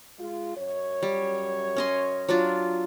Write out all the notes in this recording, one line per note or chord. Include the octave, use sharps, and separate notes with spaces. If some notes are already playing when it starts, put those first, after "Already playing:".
G#3 F4
F#2 C#5
G3
C#4 D#5 C6
F#3 D4 F4